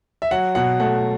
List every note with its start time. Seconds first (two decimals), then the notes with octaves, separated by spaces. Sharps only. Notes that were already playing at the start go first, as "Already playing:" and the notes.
0.22 E5
0.31 F#3 F#5
0.55 B2 F#5
0.80 A3 F#5